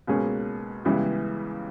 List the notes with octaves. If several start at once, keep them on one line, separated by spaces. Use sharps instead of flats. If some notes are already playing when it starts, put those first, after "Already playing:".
C#2 B2 A#3 C#4 G#4
C#2 C#3 E3 G3 B3